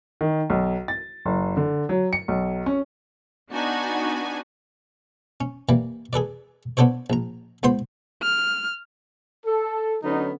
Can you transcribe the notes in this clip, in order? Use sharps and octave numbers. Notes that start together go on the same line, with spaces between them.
D#3
B1
A6
F#1
D3
F#3
C#7
B1
C#4
B3 D4 D#4 F#4 G#5
C#4
E3 G3 A#3
G#4 A4 B4 D5
B3 D4 A4 C5 C#5
A#1 A#5
C#2 B3 C5 C6
F6
A4
D3 F#3 B3 C#4 D#4